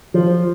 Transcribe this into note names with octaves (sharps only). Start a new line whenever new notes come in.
F3